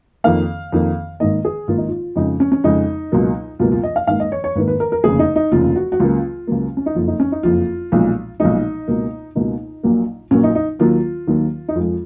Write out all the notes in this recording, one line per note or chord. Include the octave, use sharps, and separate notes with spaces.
F2 D#3 A#3 F5
F2 D#3 A#3
G#1 G#2 D#3 A#3 D#5
G#4
G#1 G#2 D#3 A#3 F4
D#4
F4
F2 C#3 G#3 D#4
C#4
C#4
F2 C#3 G#3 D#4
C#2 B2 F#3 A#3
C#2 B2 F#3 A#3 F4
F4
D#5
F5
G#1 G#2 D#3 A#3 F5
D#5
C#5
C#5
G#1 G#2 D#3 A#3 B4
B4
A#4
A#4
F1 D#2 C#3 G#4
D#4
D#4
F1 D#2 C#3 F4
F#4
F#4
C#2 C#3 F#3 A#3 F4
C#2 C#3 F#3 A#3
C#4
D#4
F#1 F2 F3 F4
D#4
C#4
D#4
F#1 F2 F3 F4
B1 A#2 F3 G#3
B1 A#2 F3 G#3 D#4
C#2 B2 A#3
C#2 B2 A#3 D#4
A#1 A#2 F#3 A#3
A#1 A#2 F#3 A#3 C#4
D#4
D#4
D#2 D#3 F#3 A#3 F4
D#2 D#3 F#3 A#3
D#4
F2 F3 G#3 F4